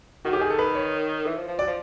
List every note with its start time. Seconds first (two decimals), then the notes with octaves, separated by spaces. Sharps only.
0.25 D#3 F#4
0.33 G4
0.41 G#4
0.50 A4
0.59 B4
0.75 C#5
1.26 E3
1.37 F3
1.48 F3
1.59 F#3 D5
1.67 F3